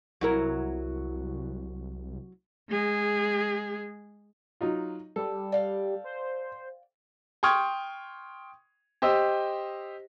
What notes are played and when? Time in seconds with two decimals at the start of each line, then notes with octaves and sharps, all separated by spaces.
0.21 C2 F#3 E4 A#4
2.70 G#3 G#4
4.61 F#3 D#4 F4
5.16 G3 A4
5.52 D5 F5 G5
6.04 C5
7.43 G5 C6 C#6 D#6 F6 G#6
9.02 G4 C5 D#5 E6